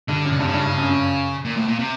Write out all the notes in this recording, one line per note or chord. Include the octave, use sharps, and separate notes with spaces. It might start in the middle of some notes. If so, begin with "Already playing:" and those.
G2 D3
F#2
C#3
G2 C3
C#3
G2
G2
F#2
F#2
A#2
A2
A#2
C3